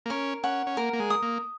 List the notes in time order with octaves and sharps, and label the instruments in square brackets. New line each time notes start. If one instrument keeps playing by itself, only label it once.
[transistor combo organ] A#3
[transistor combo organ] C#4 [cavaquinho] A#4
[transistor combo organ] C#4 [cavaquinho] F#5
[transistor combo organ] C#4
[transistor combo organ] A#3 [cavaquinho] A#4
[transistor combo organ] A#3
G#3
[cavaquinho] D#6
[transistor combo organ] A#3